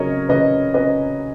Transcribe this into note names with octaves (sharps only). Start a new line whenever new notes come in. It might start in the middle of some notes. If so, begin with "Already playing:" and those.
Already playing: C#3 F#3 A#4 C#5 D#5
C#3 B4 D#5
C#4 B4 D#5